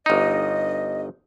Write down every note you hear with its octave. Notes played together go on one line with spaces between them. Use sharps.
G1 D#4 D#5